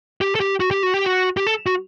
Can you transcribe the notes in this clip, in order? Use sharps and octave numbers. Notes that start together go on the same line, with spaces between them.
G4
A4
G4
F#4
G4
F#4
G4
F#4
G4
A4
F#4